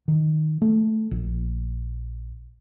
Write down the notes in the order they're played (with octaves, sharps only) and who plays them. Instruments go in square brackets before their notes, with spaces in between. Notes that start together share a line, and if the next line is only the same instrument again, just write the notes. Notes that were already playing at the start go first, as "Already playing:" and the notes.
[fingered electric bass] D#3
A3
A#1